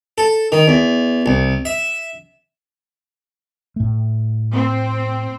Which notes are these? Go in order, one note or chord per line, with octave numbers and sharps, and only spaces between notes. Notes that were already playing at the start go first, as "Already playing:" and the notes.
A4
D#3
E2
C2
E5
A2 A3
C4